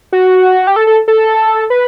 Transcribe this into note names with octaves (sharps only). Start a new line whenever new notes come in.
F#4
G4
A4
A4
A4
B4